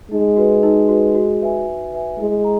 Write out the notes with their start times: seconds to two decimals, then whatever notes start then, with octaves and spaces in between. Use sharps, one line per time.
0.11 G#3 D#4
0.36 F#4 B4
0.63 D#4
0.89 F#4 B4
1.15 F#4
1.41 B4 E5 G#5
1.67 F#4
1.93 B4 E5 G#5
2.19 G#3 E4
2.44 A#5